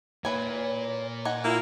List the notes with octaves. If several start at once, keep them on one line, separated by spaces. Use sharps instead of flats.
A#2 E3 B4 C#5 G#5
D#4 F#5 G#5
A#3 E4 F4